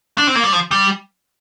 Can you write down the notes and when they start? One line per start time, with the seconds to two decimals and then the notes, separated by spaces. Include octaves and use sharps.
0.18 D4
0.27 C4
0.35 A#3
0.44 G3
0.53 F3
0.71 G3